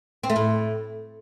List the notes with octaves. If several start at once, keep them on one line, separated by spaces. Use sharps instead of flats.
C4
A3
A2